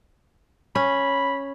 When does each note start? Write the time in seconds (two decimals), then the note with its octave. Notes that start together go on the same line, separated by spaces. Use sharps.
0.75 C#4 B5